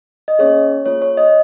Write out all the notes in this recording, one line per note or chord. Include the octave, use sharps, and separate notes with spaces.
D#5
A#3 C#4 G#4 C#5
A#3 F4 G#4 C#5
C#5
D#5